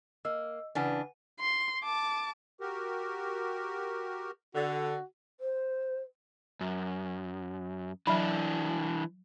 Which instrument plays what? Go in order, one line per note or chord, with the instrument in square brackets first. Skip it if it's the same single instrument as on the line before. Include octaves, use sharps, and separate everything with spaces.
[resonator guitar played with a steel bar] A#3 [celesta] D#5 E6
[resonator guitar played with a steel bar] C#3 E3 D4 [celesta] B4 F#5 G#5
[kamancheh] C6
A5 D6
[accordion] F#4 G4 A#4
[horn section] D3 [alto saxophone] F#4
[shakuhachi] C5
[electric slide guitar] F#2
[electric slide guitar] E3 D4 [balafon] F#3 B5